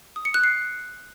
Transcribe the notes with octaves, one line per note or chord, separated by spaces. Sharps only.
D#6
C#7
F#6
C7